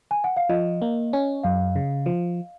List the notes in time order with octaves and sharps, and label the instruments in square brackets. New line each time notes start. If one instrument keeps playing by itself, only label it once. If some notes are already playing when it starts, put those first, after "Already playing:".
[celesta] G#5
F#5
F5
[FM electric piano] F3 [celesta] D#5
[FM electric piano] A#3
C#4
[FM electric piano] F#2 [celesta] F5
[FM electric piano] C#3
F3